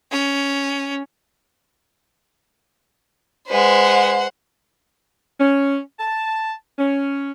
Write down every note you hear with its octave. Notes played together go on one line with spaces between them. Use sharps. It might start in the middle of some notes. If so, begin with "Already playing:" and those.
C#4
G#3 B4 C5 F#5
C#4
A5
C#4